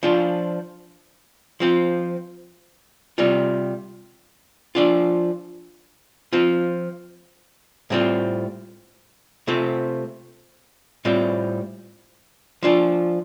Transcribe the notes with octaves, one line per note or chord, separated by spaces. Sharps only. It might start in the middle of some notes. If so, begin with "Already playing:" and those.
F3 D4 F4
F3 C4 F4
C3 G3 F4
F3 D4 F4
F3 C4 F4
A2 G3 C4 F4
C3 A3 C4 F4
A2 G3 C4 F4
F3 D4 F4